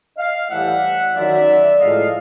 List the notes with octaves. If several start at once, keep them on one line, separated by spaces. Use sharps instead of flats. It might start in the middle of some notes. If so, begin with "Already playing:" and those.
D#5 F5
A2 E3 G3 E5 F#5
F#2 D#3 F#3 D5 E5
A2 F3 G#3 D#5 F5